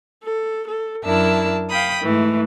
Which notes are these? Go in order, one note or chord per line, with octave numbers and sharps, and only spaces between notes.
A4
A4
F#2 D4 E4 A#4 A5 E6
F5 G5 B5 D#6
G#2 E3 A3